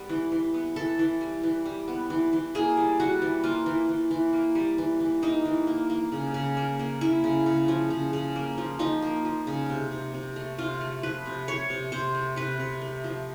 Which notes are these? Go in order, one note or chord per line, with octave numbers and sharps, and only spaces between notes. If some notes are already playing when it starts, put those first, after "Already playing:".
Already playing: G3 B3
E3
E3
B3
E3 A4
E3
G3
E3
G3
B3
E3
E3
A#3 G#4
G3
G3 F#4
E3
A#3 F4
E3
E3
E3
A#3
G3
E3
E3
A#3 D#4
E3
A#3
A#3
C#3
C#3
A#3
A#3
A#3 E4
C#3
C#3
F3
C#3
C#3
A#3
F3
F3 D#4
A#3
F3
C#3
C3
C3
C3
A3
C3 F4
A3
F3 B4
C3
A3 C#5
C3
C3 C5
A3
C3 B4
C3
A3
F3